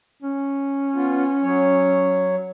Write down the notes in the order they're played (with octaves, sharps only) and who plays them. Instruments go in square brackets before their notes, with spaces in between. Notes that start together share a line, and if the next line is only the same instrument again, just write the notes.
[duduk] C#4
[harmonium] B3 F4
F#3 C#5